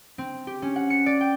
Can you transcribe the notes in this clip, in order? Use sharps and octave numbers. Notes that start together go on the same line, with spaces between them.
C4
G4
C#4
F#5
C#7
D5
G5